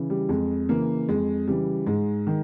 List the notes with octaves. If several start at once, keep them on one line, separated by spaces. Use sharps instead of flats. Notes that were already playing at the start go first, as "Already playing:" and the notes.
Already playing: C#3 E3
G3
F2 G#3
C#3 E3 A#3
F2 G#3
C#3 E3 G3
G#2 G#3
D#3